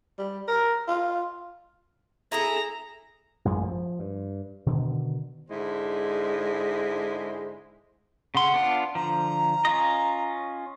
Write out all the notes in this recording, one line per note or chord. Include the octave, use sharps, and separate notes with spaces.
G3
A#4
F4
E4 G#4 A4 A#5
A1 F#2 G#3
F3
G2
B2 D3 D#3
G#2 D3 G#3 E4 C5
C#3 F#5 C6
B3 D4 F4
D3 F3 A#5
C#4 F4 D#5